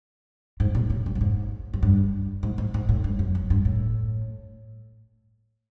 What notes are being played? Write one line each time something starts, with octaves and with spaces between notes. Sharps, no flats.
G#2
A#2
A2
G2
A2
G#2
F#2
G2
G#2
G#2
G#2
A2
G2
F#2
F#2
G2
A2